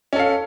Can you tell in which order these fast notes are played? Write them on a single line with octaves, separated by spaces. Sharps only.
C#4 A4 F5